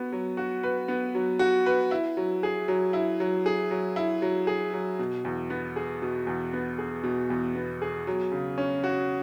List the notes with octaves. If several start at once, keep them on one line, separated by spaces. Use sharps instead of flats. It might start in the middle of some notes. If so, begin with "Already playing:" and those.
Already playing: B3 F#4
F#3
F#4
B4
B3
F#3
F#4
B4
E4
F#3
G#4
F#3
E4
F#3
G#4
F#3
E4
F#3
G#4
F#3
B2
E2
B3
G#4
B2
E2
B3
G#4
B2
E2
B3
G#4
F#3
C#3
C#4
F#4